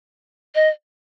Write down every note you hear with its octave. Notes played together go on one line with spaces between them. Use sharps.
D#5